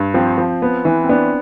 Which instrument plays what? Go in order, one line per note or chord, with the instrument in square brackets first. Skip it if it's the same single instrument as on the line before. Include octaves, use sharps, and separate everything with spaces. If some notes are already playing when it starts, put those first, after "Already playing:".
Already playing: [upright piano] G2
[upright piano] F3 [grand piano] C4
[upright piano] F3
B3
E3
[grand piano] C4
[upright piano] B3 [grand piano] D4